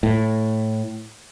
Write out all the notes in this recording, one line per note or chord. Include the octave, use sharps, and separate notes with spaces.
A2